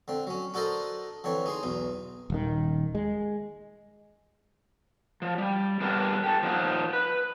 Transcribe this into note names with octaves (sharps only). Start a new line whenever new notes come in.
D3 C4
F#3 C#4
D4 F#4 A4 A#4 C5 D#5
D3 E3 C4 C#5
D#4 G#4 C6
B1 E2 D#4
D#1 D#3
G#3
F3
G3
G3 A3 B3 D4 G4 A#4
G4 A4
F3 A#3 D#4 F#4
B4